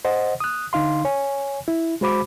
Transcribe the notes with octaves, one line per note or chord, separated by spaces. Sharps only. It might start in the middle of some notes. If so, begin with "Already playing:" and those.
C5 D#5 F#5
D#6 F#6
D3 D#4 F5 C6
C#5 G#5
E4
G#3 F#4 C5 B5 D6